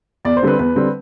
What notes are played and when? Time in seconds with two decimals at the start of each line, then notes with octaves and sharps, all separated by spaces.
0.25 E2 D5
0.37 C5
0.43 D3 G3 C4 B4
0.59 E2 B4
0.75 D3 G3 C4